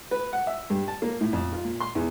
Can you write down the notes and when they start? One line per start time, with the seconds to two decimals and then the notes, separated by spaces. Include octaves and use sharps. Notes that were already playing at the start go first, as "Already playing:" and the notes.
0.11 B4
0.33 F#5
0.47 E5
0.70 G2
0.88 A5
1.02 A#3
1.21 A2
1.33 F2
1.53 F4
1.65 A#2
1.80 C6
1.95 E2